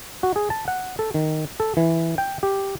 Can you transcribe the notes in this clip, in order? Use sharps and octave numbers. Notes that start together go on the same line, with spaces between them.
F#4
G#4
A5
F#5
A4
D#3
A4
E3
G5
G4